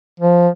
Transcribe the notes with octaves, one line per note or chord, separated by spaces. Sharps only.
F3